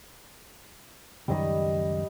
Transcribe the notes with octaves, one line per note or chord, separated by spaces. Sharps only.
C#2 F#2 D#3 G3 D#5 B5